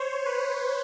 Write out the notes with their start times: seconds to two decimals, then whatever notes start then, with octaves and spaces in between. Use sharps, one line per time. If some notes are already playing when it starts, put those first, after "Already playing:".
Already playing: C5 C#5
0.26 B4